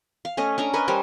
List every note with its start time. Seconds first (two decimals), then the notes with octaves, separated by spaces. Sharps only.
0.25 F5
0.37 A3 C#4 D#5
0.58 C#4 D4 A#5
0.73 A#4 B4 C#5 D#5
0.88 G3 C#4 A#4 C5